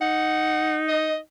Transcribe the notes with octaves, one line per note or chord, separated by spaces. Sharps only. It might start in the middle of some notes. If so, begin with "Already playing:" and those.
D#4 F#5
D#5